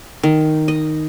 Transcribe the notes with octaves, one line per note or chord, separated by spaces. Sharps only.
D#3
D#5